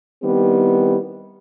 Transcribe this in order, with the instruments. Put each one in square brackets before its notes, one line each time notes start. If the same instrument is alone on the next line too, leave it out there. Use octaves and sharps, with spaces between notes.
[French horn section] D#3 G3 B3 C4 E4 G4